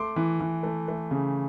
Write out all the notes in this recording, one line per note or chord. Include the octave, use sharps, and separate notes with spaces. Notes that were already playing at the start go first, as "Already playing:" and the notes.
Already playing: A3 C6 D6
E3
E3
A3
A3
C#3